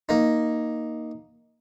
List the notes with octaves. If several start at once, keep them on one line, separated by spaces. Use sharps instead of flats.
A#3 D#4